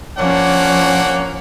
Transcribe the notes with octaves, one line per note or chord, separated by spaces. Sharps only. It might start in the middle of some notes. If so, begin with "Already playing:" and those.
F3 A#3 C#4 D4 C#5 F#5